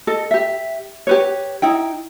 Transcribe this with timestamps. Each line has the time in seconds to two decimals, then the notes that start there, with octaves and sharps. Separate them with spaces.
0.07 A4 D#5
0.31 G4 E5
1.07 G4 B4 C#5
1.62 D#4 E4 G5